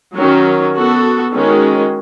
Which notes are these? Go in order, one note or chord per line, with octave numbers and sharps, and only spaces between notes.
D#3 F#3 C#4
B3 F#4 A4
D#3 G#3 C#4 F#4